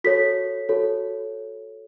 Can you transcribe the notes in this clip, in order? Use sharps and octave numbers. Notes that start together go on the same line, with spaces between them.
F#4 A4 C#5 B6
F#4 A4 C#5